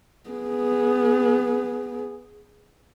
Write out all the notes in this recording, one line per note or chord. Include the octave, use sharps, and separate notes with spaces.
B3 G#4